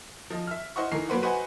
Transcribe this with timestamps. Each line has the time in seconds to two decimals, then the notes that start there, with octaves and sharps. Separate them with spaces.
0.30 F3 D#5
0.47 E5 F6
0.76 E4 C5 D#5 F#5 C#6
0.92 E3 A3 D#4 A#4 C7
1.09 F#3 A#3 B4 C5 F#5
1.22 F#4 B4 C5 D#5 F#5 G#5